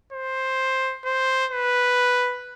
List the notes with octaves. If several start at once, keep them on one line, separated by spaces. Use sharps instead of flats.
C5
C5
B4